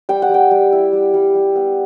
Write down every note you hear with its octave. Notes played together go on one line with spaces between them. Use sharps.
G3 G5
F#5
G3 G5
G3
E4
G3
G3
G3
B3